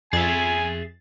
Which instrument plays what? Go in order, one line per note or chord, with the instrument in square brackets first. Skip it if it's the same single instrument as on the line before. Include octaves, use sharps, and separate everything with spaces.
[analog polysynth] F2 A6 [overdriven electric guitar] G#4 E5 [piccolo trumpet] G#5